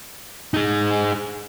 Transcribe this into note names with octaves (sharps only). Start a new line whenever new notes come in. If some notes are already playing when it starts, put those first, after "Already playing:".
D#4 G#4